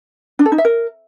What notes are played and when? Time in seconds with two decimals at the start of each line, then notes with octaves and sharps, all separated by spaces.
0.39 D4
0.46 A4
0.52 D#4
0.58 E5
0.65 A#4